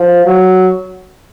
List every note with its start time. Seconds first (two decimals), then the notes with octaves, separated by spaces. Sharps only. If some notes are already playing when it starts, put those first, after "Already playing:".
Already playing: F3
0.26 F#3